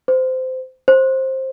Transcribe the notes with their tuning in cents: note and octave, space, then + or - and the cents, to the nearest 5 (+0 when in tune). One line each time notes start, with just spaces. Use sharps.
C5 -20
C5 +15